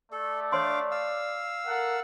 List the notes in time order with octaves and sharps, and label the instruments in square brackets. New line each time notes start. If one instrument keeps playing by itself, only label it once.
[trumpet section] A3 [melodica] A4 [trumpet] D5
[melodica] D4 F5 D6 [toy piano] C#5 C6
[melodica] F5 E6
[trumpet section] A4 F#5 [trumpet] A#4